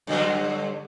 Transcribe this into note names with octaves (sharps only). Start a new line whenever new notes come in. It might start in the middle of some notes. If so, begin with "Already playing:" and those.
G2 D3 F#3